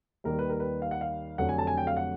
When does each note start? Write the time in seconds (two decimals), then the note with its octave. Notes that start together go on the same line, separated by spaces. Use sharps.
0.24 D#2 D#3 G3 A#4
0.39 B4
0.49 A#4
0.60 B4
0.82 F5
0.91 F#5
1.01 F5
1.38 F1 F2 D3 F#3 F#5
1.49 G#5
1.58 A5
1.67 G#5
1.78 G5
1.87 F5
1.97 F#5